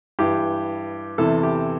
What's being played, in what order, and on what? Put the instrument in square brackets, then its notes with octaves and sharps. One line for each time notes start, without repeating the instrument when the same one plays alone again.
[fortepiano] G2 E3 G4
E2 C3 E3 A4
G4